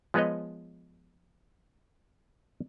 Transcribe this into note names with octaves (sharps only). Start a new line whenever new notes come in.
F3 G#3 B3 B4 C#5 D#5